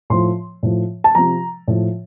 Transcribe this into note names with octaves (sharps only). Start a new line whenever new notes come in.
A2 F3 C6
A2 F3
A5
C3 F3 A#5
A2 F3